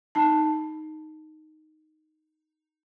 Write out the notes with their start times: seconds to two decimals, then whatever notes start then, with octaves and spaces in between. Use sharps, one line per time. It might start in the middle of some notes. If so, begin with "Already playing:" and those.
0.15 D#4 A5